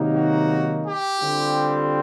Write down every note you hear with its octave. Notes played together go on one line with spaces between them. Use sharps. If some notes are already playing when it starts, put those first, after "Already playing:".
Already playing: C3 D#3 F#3 A#3 D#4
F#4
G4
D3 G3 C4 F4